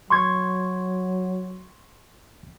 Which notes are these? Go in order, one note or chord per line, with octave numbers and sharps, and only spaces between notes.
F#3 C6 C#6 G#6